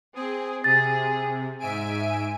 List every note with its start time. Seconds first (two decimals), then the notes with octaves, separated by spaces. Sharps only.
0.15 C4 G#4
0.64 C3 G#4 A6
1.60 G#2 E5 G#5 D7